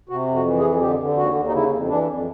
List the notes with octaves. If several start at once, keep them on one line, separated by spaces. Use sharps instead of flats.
C3 F#4
F2
F#4
E3
G#4
F2
D3 G4
D3
D#2 F#4
D#2
D#4
C#3 E4
F2
E3 D4
F2